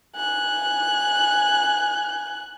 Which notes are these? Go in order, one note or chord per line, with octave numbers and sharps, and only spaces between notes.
G#5 F#6